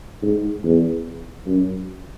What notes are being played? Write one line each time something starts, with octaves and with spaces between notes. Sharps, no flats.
G#2
E2
F#2